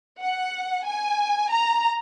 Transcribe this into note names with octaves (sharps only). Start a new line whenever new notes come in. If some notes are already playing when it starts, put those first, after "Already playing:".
F#5
G#5
A#5